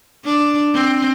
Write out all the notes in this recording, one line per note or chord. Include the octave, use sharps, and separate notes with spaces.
D4
C4